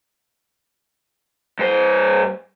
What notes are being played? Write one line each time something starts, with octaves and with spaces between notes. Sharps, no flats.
G2 C5